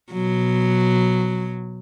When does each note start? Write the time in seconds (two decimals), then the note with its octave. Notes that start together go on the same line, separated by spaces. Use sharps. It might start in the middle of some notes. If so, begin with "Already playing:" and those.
0.12 B2 F#3